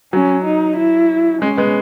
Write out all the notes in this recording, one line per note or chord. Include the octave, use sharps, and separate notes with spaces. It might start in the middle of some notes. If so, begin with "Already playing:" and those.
F#3 C#4
D#4
E4
G#3 C#4
G#3 B3